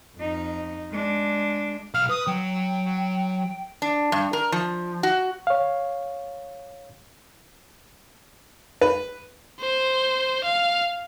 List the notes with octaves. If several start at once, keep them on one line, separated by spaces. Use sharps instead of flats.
F2 D#4
G#3 D4
B1 F5 F6
B4 D#6
F#3 G5
D4
G2
A#4
F3
F#4
C#5 F5
B4
C5
F5